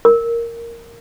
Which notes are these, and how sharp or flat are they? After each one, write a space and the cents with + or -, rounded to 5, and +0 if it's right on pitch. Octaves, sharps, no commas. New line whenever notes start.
A#4 -5